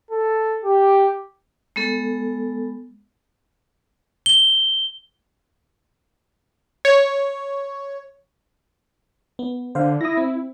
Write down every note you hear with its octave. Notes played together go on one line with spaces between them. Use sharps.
A4
G4
G#3 B3 A4
G7
C#5
B3
D3 C5 F5
E4 D#6 A#6
C4